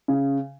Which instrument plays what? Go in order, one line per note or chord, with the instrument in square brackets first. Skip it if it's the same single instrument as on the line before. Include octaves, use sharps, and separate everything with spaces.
[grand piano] C#3